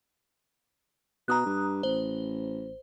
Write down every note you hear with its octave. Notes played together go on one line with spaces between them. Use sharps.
B2 A#5 D#6 F#6
G2
A1 C5